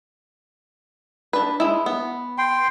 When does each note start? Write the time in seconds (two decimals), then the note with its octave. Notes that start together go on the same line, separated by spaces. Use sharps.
1.33 D4 B4
1.60 G#3 E4
1.86 B3
2.38 G5 C6